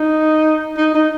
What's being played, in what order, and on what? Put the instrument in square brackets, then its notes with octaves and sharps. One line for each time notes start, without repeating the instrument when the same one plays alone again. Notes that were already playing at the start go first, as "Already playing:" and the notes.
Already playing: [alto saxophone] D#4
D#4
D#4